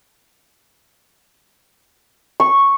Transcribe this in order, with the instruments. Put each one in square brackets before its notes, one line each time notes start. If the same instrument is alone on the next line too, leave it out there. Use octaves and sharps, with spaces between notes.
[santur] C#6